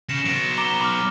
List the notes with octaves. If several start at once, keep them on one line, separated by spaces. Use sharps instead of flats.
C#3 A#6 C#7 E7
F#3 B3 A#6 D7
A#5 D6 G7
B5 D6 F6